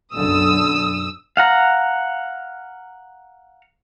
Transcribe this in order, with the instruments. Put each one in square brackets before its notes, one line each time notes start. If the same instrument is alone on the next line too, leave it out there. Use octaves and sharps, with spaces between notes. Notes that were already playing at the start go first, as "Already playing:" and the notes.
[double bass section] B1 F#2 D3 [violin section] D#6 E6
[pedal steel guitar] F5 F#5 A#5